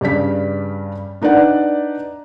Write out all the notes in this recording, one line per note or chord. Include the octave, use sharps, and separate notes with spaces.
G2 C#3 D5 B6
D4 D#4 B4 D5 F#5